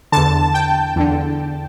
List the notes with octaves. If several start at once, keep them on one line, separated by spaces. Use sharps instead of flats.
E2 D3 A5
G5
E2 D3